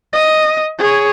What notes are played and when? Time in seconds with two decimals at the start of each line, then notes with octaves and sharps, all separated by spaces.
0.13 D#5
0.79 G#4 C#5